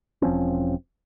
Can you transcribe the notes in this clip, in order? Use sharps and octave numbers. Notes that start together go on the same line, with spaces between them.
E1 F3 C4 C#4